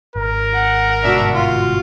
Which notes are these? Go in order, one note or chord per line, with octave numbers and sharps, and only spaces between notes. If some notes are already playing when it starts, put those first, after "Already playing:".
G#1 A#4
F#5
G1 G#2 B2 D4 F#4 E5
F4